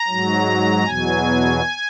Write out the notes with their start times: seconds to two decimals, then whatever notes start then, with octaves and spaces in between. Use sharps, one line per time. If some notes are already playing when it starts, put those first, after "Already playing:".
Already playing: A#5
0.08 G#2 F#3
0.84 E2 B2 F#3 G#5